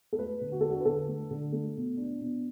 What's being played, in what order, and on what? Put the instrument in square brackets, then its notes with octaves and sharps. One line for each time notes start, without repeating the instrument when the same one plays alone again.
[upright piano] A4
A3 B4
D3
F#4
D4 A4
F#4
B4
D3 A4
A3
D3
A3
B2
D4
B2